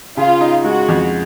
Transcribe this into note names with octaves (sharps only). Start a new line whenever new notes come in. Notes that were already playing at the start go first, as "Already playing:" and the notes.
C#3 F4
D#4
G#3 F#4
F2